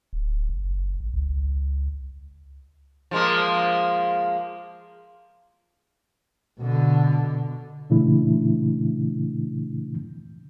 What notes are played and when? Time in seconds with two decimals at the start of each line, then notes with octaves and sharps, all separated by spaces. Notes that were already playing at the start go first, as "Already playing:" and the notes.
0.13 D1
0.49 F#1
1.00 A1
1.14 C#2
3.11 F3 G#3 A#3
6.60 B2 D3
7.90 A#2 C#3 E3 A3 D4 E4